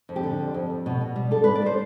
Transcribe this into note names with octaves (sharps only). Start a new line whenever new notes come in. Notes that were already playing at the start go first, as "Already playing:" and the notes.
F2
G4
D3
F2
F2
F2
B2
B2
G3
G3 A4
B4
G3
D5
G3 C5